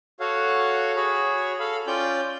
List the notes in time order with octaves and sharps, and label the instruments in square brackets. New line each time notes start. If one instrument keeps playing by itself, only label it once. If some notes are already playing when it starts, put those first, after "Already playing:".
[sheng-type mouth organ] F#4 A4 C#5 F5 F#5
F#4 G#4 C#5 B5
A4 F5 B5
C#4 F4 D5 G5 G6